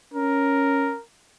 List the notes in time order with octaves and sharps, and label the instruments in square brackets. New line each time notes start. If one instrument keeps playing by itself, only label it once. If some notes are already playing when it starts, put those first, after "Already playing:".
[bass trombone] C#4 [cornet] A#4